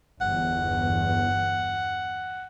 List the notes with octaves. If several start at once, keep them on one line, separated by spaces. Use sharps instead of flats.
G1 E2 F#5